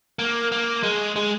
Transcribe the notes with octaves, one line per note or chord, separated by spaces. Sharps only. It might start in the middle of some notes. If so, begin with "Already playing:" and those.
A#3
A#3
G#3
G#3